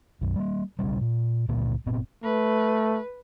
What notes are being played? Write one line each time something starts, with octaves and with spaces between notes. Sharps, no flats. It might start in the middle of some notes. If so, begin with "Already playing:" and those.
B1 F#2
G3 A#3
D#1 B1 C#3 G3
A#2
C#2 A#2 D3 A#3
F#1 A#2 B3 C4
A3 B4